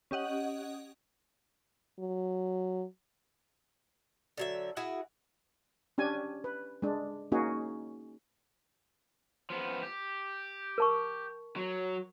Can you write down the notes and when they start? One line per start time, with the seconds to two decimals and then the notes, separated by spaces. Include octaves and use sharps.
0.11 C#4 G4 D#5 F#5
1.99 F#3
4.37 D3 F#3 E5
4.77 E4 F#4 G#4 F#5
5.98 C#4 D4 G4 G#5
6.44 B4
6.82 G#3 D4
7.32 A#3 C#4 D#4 F#4 G#4
9.50 F3 B3
9.83 G4
10.78 A#4 A5 C#6
11.56 F#3